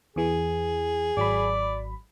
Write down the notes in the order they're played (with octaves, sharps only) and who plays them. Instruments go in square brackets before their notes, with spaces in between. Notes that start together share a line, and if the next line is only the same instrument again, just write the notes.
[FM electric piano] E2 E3 [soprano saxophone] G#4
[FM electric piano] G#1 F#3 B5 [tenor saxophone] D5